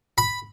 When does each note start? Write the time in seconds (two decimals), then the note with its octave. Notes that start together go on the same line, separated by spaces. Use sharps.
0.18 B5